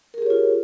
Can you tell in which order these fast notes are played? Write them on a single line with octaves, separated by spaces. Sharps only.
A#4 G#4 G4 C#5 F4